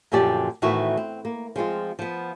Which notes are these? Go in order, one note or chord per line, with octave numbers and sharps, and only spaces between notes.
F#2 A#2 D3 F3 G4 D5
A2 D#3 E3 B3 E4 F#4
C4
A#3
F3 G#3 C4 F4
F3 B3